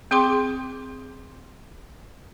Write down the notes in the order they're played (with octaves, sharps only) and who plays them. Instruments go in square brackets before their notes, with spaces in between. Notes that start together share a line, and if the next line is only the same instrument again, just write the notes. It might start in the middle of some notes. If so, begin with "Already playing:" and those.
[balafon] C4 G#4 G5 C6 D6